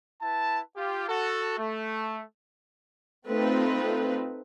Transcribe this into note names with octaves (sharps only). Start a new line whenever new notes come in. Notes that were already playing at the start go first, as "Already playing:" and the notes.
E4 B4 A5
F4 G4
F#4 A4
A3
A3 C4 D#4 F4 B4